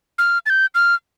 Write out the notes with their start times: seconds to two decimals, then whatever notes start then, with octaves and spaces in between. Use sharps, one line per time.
0.18 F6
0.46 A6
0.50 G6
0.75 F6